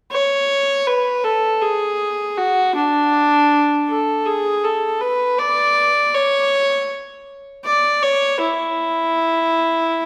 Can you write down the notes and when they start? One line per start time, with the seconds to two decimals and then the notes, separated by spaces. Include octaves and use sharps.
0.12 C#5
0.87 B4
1.24 A4
1.62 G#4
2.37 F#4
2.75 D4
3.89 A4
4.25 G#4
4.64 A4
5.01 B4
5.38 D5
6.14 C#5
7.65 D5
8.02 C#5
8.41 E4